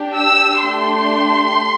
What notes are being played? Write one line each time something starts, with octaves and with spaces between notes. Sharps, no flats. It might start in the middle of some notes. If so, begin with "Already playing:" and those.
Already playing: D4 G4
E6
A3 D4 G4 C6